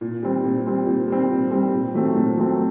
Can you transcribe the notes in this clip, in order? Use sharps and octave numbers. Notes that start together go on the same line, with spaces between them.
A#2
G3 C4
A#2
G3 C4
A#2
G3 C4
A#2
G3 C4
A#2
F#3 A3 C4
A#2
F#3 A3 C4